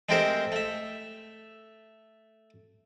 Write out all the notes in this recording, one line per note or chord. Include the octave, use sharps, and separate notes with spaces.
G#3 A3 C4 G4 A#4 C5
A3 E5